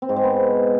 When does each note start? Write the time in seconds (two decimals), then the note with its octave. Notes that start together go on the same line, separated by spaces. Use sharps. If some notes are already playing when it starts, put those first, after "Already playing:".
0.02 C4
0.09 G#2
0.16 G#3
0.23 B3